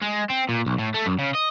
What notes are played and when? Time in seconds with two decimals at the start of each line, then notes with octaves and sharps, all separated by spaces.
0.02 G#3
0.30 C4
0.49 A#2
0.66 B1
0.79 A2
0.94 A3
1.06 F#2
1.19 C#3
1.35 D#5